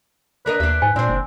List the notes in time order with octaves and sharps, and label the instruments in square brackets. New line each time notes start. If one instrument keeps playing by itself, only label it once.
[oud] D4 A#4 D#5 [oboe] B4
[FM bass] D#2 [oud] D4 E5
[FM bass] G#2 [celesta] G#5
[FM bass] A#2 [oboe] C4 [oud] D4 C5
[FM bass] F#1